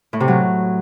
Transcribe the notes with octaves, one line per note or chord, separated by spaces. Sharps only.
A2
C3
F#3